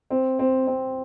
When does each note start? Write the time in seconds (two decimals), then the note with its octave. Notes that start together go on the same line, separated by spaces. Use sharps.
0.10 C4
0.39 C4
0.67 C4